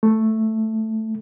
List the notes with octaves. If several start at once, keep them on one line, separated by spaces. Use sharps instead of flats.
A3